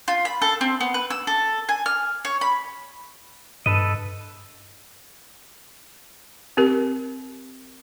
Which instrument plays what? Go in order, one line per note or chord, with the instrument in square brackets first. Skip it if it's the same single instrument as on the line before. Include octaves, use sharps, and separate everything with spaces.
[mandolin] F4
B5
A4
C4
B3
B4
E6
A4
G#5
F6
C#5
B5
[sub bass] G2 [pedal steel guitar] A4 B4 D#5
[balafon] C4 G4 A#4